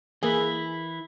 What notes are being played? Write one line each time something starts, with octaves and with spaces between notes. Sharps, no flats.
E3 A#3 E4 G#4